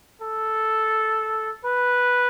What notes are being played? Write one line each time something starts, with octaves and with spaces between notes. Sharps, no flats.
A4
B4